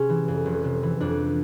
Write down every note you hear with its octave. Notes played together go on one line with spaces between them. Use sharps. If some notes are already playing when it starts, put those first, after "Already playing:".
Already playing: C3 C#4 G#4
E3
F2
F1
C3
E3
F2 D4